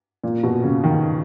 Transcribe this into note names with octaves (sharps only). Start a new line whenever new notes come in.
A#2
B2
C#3
D#3